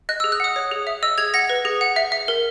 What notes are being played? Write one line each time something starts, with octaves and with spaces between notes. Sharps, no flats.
D#5 F#6
G#4 E6
F#6
F#5 D#6
C#5
G#4
E5
D#5 E6
G#4 G#6
F#5 A#6
B4
G#4
F#5
E5
E5
A#4